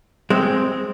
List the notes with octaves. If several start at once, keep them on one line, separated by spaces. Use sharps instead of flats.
G#3 C4